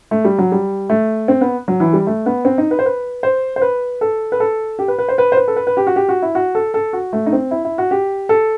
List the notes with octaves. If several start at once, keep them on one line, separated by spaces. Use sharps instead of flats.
A3
G3
F#3
G3
A3
C4
B3
F#3
E3
G3
A3
B3
C4
D#4
B4
C5
B4
C5
C5
B4
A4
B4
A4
G4
B4
B4
C5
B4
C5
B4
A4
B4
B4
G4
F#4
G4
F#4
E4
F#4
A4
A4
F#4
A3
D#4
C4
E4
E4
F#4
G4
A4